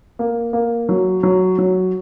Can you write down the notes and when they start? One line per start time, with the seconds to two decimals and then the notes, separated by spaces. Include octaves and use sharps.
0.19 A#3
0.53 A#3
0.89 F#3
1.23 F#3
1.58 F#3